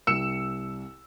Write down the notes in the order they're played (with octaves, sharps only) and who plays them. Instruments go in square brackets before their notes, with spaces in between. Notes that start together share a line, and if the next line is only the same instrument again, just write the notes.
[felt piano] C2 [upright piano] E6 C#7 E7